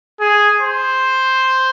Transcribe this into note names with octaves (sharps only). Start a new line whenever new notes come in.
G#4
C5